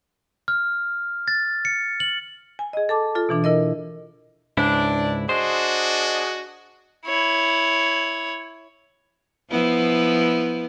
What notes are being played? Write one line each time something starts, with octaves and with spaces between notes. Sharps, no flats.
F6
A6
C#7
F#7
G#5
G#4 D#5
A4 A5 D6
F4 A4
B2 E3 D4
E4 A#4 D#5
C#2 G#2 D4 E4
D4 F#4 G#4 C5 D#5
E4 C#5
F3 B3 E4